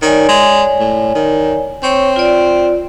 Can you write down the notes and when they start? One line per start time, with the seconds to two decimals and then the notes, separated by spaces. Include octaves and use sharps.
0.02 D#3 C#5 D5 G#5
0.29 G#3
0.79 A2
1.15 D#3
1.83 C4 C#5 C#6
2.16 F4 D5